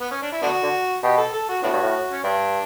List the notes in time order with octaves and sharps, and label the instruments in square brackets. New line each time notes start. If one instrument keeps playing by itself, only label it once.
[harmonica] B3
C#4
D4
E4
[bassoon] D3 [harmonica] B3 D4 F#4
[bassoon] D3
[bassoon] B2 [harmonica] G4
[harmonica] A4
A4
F#4
[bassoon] A2 [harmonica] B3 D4 F#4
[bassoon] G2
A2
[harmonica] C#4
[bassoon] G2 [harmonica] D4